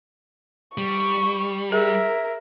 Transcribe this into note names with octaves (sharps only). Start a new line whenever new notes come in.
G3 C#6
G#4 A#4 E5